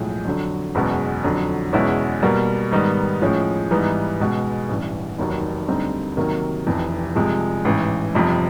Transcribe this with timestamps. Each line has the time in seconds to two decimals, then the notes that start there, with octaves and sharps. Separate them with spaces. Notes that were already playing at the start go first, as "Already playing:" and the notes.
Already playing: B1 A2 F3 G#3
0.25 F2 D3 F#3
0.75 F#1 E2 B2 G#3
1.24 F2 D3 F#3
1.73 E2 B2 G#3 C#4 E4
2.22 B2 G3 A#3
2.71 G#2 D#3 G3 B3 D#4
3.22 A2 F3 G#3 C#4
3.71 G#2 E3 G3 B3 D#4
4.20 C#2 B2 G#3
4.69 A1 G2 E3
5.18 F1 D#2 D#3 F#3
5.68 D2 D3 G3 C4 D#4
6.17 C3 D#3 F#3 A#3
6.67 F1 F2 C3 E3
7.15 C2 C3 F3 G#3
7.65 A1 G#2 E3
8.14 G1 F2 C3 F3